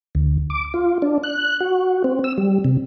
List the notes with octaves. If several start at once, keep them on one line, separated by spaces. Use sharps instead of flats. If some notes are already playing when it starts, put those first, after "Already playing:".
D2
D6
F4
D4
F#6
F#4
C4
E6
G3
C3